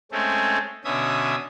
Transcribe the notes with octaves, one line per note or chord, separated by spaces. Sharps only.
G#3 A3 C4 C#4
B2 D3 C#4 E5 D#6